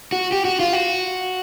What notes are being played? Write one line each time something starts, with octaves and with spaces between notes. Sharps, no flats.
F#4
G4
F#4
F4
F#4